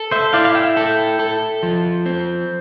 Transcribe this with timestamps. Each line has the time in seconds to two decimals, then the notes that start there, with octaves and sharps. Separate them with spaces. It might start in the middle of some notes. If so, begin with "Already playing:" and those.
Already playing: A4
0.11 C5 E5
0.33 E4 D5 F5
0.45 F5
0.55 E5 G5
0.77 A4
1.19 A4
1.63 F3
2.06 C4